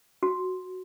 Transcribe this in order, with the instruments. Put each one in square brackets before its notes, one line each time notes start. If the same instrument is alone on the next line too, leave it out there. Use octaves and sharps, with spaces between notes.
[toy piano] F#4